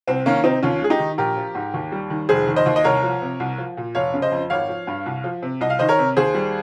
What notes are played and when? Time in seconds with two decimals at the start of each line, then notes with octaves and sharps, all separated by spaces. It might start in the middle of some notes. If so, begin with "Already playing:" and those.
0.08 C2 C4
0.25 D#3 A#3 C#4
0.44 C3 C4 D#4
0.63 D#2 C#4 F4
0.82 G#3 G#4
0.90 D#4 G4
0.99 D#3
1.18 A#1 G4 A#4
1.37 F3
1.55 G#2
1.74 D#2
1.92 G3
2.10 D#3
2.29 F1 G#4 C5
2.47 D#3
2.56 C5 D#5
2.66 D#2
2.76 D#5
2.84 C2 A#4 C#5
3.02 F3
3.22 C3
3.40 C2
3.58 F3
3.77 A#2
3.95 F1 C#5 F5
4.14 C#3
4.22 C5 D#5
4.32 F2
4.50 G#1 C#5 F5
4.69 F3
4.87 G2
5.06 C2
5.24 F3
5.43 C3
5.61 C2 D#5
5.70 F5
5.79 D#3 C5 D#5
5.89 A#4 C#5
5.99 C3
6.17 D#2 G#4 C5
6.35 G3